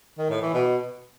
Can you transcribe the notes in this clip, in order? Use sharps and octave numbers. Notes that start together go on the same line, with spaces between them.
D#3
A2
E3
B2